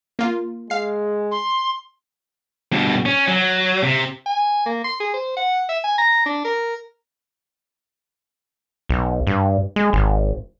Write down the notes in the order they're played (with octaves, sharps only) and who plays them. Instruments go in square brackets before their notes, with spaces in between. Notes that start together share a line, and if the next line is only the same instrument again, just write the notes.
[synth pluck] A#3 F4
[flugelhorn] G#3 [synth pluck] F5 C7
[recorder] C6
[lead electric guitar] G2 B2
C#4
F#3
C3
[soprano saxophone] G#5
A#3
C6
G#4
C5
F#5
E5
G#5
A#5
D4
A#4
[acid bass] B1
G2
G#3
G#1